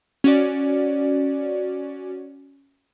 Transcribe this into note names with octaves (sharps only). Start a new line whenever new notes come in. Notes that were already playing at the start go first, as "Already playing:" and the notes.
C#4 F#4 D5